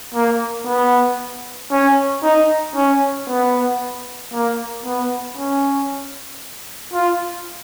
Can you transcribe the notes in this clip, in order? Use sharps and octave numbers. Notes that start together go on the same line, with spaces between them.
A#3
B3
C#4
D#4
C#4
B3
A#3
B3
C#4
F4